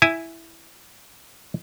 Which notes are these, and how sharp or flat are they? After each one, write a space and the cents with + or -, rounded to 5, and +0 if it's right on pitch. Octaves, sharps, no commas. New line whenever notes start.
E4 +0 G#5 +0